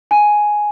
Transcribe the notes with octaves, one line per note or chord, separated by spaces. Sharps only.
G#5